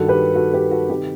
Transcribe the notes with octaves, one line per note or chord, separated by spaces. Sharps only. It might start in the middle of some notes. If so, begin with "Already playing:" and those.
Already playing: G2 D#3 F#4 A4
G4 B4
F#4 A4
G4 B4
F#4 A4
C3 D#3 G4